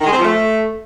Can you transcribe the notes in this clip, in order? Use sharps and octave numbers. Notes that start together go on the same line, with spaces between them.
D#3
G#3
C4
F3
A3